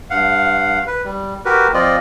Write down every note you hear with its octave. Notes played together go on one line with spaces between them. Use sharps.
G2 F5 F#5
B4
G3
F#4 G4 A#4 B4
F3 C4 F4 D5 D#5